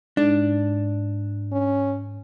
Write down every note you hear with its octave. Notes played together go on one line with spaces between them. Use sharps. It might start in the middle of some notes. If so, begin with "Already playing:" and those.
G#2 D4
C#4